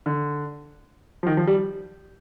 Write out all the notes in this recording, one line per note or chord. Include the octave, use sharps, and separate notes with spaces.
D3
F3
D#3
F3
G3